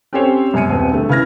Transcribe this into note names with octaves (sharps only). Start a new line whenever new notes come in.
C4 C#4 G4 A4 C5 C#5
F#2 B2 G#5 C#7 D#7
D#1 C4 B4
D3 A3
C#3 E4 B4 F6 G#6 A#6